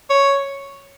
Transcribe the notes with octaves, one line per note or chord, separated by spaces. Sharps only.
C#5